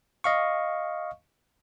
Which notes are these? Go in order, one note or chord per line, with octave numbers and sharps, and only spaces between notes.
D#5 F5 C#6